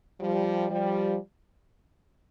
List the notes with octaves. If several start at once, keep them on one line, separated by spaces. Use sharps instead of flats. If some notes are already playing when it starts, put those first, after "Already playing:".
F3 G3
F3 G3